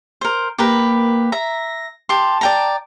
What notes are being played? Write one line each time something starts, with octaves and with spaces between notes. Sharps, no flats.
A#4 C5
A#3 G4 A#4 B4
E5 A#5 A#6
G4 A5 C6
D5 G5 A#5